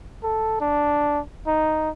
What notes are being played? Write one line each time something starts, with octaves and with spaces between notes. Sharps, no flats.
A4
D4
D#4